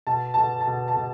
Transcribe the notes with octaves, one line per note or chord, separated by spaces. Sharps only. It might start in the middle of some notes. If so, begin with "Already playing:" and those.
B2 A5
B2 A5
A5
B2
A5
B2